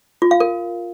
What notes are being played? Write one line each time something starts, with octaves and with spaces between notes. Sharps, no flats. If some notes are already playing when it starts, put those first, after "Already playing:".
F4
F5
A#4